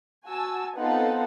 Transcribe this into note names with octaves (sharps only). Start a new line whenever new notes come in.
F#4 G#5 A5 E6
B3 C4 D#4 F4 A4 F#5